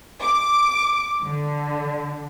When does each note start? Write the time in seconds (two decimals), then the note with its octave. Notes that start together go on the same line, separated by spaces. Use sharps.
0.22 D6
1.23 D3